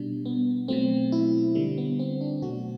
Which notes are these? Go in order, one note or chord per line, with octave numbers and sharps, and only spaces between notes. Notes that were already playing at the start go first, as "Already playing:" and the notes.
Already playing: B2 G3 D4
B3
B2 F#3 A3 C4
E4
D3 G3
B3
C4
D4
B2 F#3 A3 F#4